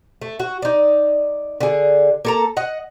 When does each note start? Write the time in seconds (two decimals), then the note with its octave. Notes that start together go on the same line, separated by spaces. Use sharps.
0.21 A3
0.40 F#4
0.62 D#4 D5
1.60 D3 G#4
2.25 A#3 A4 A#5
2.57 D#5 F#5